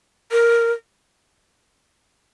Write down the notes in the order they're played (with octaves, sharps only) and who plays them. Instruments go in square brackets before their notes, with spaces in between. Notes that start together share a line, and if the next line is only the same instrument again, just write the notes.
[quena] A#4